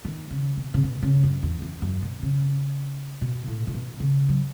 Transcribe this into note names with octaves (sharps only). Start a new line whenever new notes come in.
D#3
C#3
B2
C#3
B2
C#3
F#2
E2
E2
F#2
B2
C#3
B2
A2
A2
B2
C#3
F#3